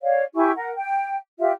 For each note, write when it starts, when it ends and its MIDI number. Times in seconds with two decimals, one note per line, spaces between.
0.01 0.23 73
0.01 0.23 74
0.01 0.23 77
0.35 0.51 64
0.35 0.51 67
0.35 0.51 80
0.35 0.51 85
0.56 0.73 70
0.56 0.73 78
0.74 1.16 79
1.39 1.51 65
1.39 1.51 67
1.39 1.51 76